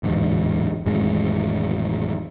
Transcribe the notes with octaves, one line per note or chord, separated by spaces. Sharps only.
D1 E2 G#2
A1 F2 D#3 G#3